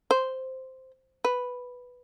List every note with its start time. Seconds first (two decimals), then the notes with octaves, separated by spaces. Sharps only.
0.11 C5
1.25 B4